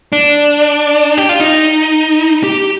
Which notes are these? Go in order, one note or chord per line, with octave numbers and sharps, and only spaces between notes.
D4
G4
F4
D#4
G4